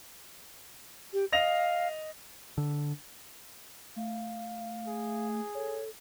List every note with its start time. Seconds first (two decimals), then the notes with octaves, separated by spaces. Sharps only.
1.13 G4
1.32 D#5 F5 A#6 F7
2.58 D3
3.96 A3 F5
4.87 G#4
5.55 A4 C#5